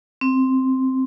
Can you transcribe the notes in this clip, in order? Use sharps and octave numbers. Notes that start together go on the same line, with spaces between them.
C4